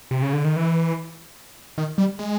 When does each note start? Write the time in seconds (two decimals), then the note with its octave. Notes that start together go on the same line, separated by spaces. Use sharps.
0.11 C3
0.22 C#3
0.33 D3
0.44 D#3
0.56 E3
1.78 D#3
1.98 G3
2.19 G#3